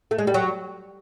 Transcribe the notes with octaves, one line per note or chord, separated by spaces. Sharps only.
A3
G#3
G3
F#3